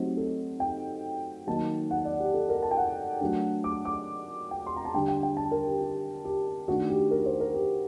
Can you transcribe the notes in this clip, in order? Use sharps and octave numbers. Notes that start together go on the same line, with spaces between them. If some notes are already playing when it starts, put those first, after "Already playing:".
Already playing: F#3 A3 C4 D#4 G4
A4
G5
D#3 F#3 A#3 D#4 A5
F#5
D5
G4
A4
A#4
A5
G5
F#5
F#3 A3 D4
D6
D6
G5
C6
A#5
A5
D3 G3 D4 G5
G5
G5
A5
A#4
G4
G4
G4
D#3 A3 D4 F#4
G4
A#4
C5
A#4
G4